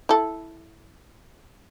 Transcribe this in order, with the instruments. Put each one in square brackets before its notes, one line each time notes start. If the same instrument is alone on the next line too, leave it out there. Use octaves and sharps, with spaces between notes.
[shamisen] E4 A4